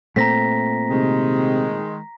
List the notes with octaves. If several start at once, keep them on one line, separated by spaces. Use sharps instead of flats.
A#2 A3 C4 A#5 A#6 B6
C3 D#3 G#3